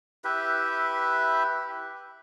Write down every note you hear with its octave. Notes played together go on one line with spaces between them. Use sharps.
E4 G4 B4 E5